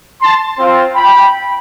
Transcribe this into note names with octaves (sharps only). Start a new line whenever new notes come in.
A5 C6
C4 F4
G5 B5